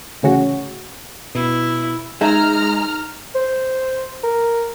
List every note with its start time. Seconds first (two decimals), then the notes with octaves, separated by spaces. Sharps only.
0.22 A1 D2 C#3 C#4 F#4
1.35 B2 E4
2.21 G#3 D#4 G#4 E5 A#5 F6
3.35 C5
4.23 A#4